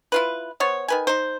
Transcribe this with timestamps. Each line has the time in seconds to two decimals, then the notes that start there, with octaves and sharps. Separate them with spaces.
0.12 E4 F4 B4
0.60 B3 C5 C#5
0.88 D#3 B4 G#5
1.07 D#4 C5